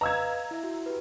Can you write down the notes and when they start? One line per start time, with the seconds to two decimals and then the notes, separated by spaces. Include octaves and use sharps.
0.01 B4 D#5 F5 A#5 E6 G#6
0.51 E4 E5
0.64 F#4
0.86 G4 B4